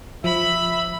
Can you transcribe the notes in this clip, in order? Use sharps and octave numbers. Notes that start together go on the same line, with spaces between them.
F3 E5 B5